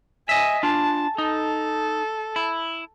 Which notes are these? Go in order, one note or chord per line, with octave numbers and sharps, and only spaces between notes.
D#5 E5 G#5
D4 F4 A5
D#4 A4
E4